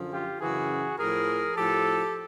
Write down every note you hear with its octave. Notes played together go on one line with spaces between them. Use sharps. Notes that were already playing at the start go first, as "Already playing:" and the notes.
Already playing: F#2 D3 F3
F4 G4
F#2 C#3 E3 F#4 G#4
A2 F3 G#4 A#4
A2 F3 G4 A4